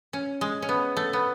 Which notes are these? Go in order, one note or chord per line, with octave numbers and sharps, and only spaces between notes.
C#4
G#3
C#4
B3
A3
B3